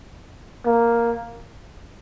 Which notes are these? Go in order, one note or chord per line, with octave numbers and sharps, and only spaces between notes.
A#3